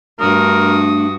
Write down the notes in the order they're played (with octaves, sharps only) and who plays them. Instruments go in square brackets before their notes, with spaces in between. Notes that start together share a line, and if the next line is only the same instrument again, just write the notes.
[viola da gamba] G2 F#4 [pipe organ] A3 D4 [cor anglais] A#4 [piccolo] D#6